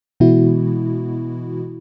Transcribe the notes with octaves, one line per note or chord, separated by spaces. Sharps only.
B2 E3 G#3 B3 E4 F#4